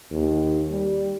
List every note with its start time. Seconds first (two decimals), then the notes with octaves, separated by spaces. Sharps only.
0.11 D#2
0.71 G3